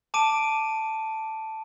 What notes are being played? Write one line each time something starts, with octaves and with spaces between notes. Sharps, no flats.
A5 D6 D7 D#7